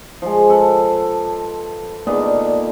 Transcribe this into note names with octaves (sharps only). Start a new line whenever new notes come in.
F3 G#3
A4 B4
A#2 D3 B3 D#4